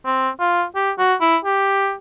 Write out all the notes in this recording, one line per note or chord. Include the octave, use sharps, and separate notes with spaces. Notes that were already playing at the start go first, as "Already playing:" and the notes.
C4
F4
G4
F#4
E4
G4